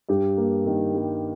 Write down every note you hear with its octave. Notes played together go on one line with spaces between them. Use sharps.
G2 G4
A#3
D#3
G3